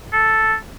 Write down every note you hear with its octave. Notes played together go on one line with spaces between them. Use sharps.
A4